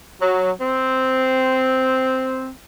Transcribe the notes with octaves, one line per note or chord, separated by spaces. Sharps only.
F#3
C4